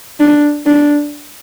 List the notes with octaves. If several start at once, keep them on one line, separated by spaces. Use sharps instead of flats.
D4
D4